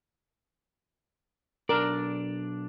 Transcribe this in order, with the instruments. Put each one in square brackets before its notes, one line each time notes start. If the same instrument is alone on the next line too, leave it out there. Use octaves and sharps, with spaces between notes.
[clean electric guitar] B1 D4 D5 [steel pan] A#4